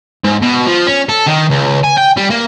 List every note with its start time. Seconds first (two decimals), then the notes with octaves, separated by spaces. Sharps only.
0.24 G#2
0.42 B2
0.66 F3
0.87 C#4
1.09 A4
1.27 D#3
1.50 C#2
1.83 G#5
1.97 G5
2.17 G3
2.30 A#3